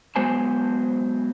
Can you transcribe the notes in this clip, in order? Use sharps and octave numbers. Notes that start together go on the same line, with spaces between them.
F#3 G#3 B3 C5 G#5 A5